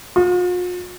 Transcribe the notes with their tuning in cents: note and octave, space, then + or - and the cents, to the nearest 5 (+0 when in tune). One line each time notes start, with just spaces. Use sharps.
F4 +45